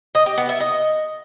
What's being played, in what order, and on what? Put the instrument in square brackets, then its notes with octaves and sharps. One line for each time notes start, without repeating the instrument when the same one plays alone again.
[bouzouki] D#5
G4
B3
E5
D#5